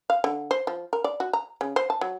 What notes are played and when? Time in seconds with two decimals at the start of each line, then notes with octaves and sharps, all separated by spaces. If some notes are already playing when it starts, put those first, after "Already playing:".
0.10 F5
0.24 D3
0.51 C5
0.67 F3
0.93 A#4
1.04 D5
1.20 F#4
1.33 A#5
1.61 C#3
1.76 C5
1.90 A5
2.01 F#3